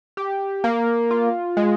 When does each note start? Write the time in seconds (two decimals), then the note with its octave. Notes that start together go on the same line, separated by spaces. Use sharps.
0.17 G4
0.64 A#3
1.11 F4
1.57 G#3